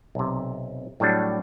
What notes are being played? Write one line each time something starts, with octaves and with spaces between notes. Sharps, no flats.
B1 C3
A2 F#3 G3 D4